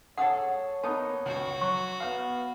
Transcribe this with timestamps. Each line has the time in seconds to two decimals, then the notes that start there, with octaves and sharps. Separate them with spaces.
0.18 G#4 A4 C#5 F#5 D#6
0.84 A#3 B3 D#4 A5
1.26 C#2 F#4
1.61 F#3 C#6
2.00 B3 F5 F6